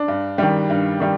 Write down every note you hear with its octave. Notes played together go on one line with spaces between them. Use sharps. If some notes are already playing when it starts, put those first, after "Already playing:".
Already playing: D4
G2
D#3 G3
G2
D#3 G3